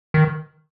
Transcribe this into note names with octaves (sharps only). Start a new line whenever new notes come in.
D#3